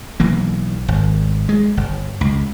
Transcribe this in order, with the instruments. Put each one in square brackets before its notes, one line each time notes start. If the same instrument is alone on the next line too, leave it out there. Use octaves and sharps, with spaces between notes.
[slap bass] B1 E3 A#3
G#1
G#3
G1
C#2